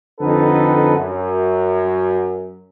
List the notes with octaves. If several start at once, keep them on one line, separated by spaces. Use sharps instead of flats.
F2 D3 D#4 A4 B4 F#5
F#2